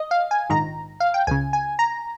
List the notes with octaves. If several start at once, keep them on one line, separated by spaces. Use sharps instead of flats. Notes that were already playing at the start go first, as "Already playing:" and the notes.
Already playing: D#5
F5
G#5
A#1 G#2 D#3 A#5
F5
G5
C#2 C#3 G#5
G#5
A#5